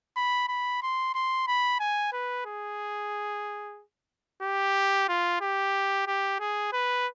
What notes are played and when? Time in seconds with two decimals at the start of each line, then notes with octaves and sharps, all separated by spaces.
0.16 B5
0.49 B5
0.83 C6
1.15 C6
1.48 B5
1.80 G#5
2.13 B4
2.46 G#4
4.42 G4
5.09 F4
5.41 G4
6.07 G4
6.40 G#4
6.73 B4